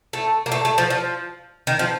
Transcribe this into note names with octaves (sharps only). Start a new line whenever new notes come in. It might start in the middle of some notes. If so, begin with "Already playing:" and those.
A3
A#3
A3
A3
F3
F3
D#3
F3